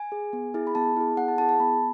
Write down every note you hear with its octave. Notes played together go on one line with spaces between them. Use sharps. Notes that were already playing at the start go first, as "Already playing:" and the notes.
Already playing: G#5
G#4
B3
E4 G#4
B5
B3 A5
E4 G#4
B3 F#5
A5
E4 G#4 A5
A5
B3 B5